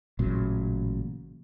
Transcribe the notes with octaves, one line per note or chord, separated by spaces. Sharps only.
A1 A#2 C#3 F#3